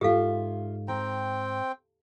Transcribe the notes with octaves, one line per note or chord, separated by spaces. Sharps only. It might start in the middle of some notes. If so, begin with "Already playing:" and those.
G#2 F4 G4 A4 E5 F5
C4 G5 A#5